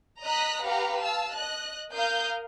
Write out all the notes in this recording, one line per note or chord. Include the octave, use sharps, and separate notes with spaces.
D#5 A#5 D#6 F#6 B6
G4 B4 F5 F#5 A#5
F5 A5 E6
D#5 F#6
A#4 F5 D#6 G6